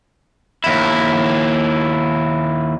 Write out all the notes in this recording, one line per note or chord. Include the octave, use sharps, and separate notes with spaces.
D#2 E4